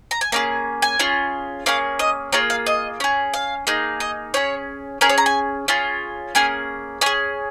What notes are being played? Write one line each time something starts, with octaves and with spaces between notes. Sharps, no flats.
A#5
G#5
A#3 C#4 G#4 F5
G#5
C#4 F4 G#4
A#3 C#4 G#4 F5
D#5
A#3 F4 G#4 C#5
F5
D#5
C#4 G#4
F5
A#3 D#4 G#4
D#5
C#4 G#4 C#5
C#4 G#4 A#4
C#5
A#5
G#5
C#4 F4 G#4
A#3 C#4 G#4 G#5
C#4 G#4 G#5